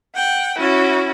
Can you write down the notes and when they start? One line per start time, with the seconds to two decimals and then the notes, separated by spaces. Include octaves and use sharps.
0.15 F#5 G5
0.58 C#4 E4 F#4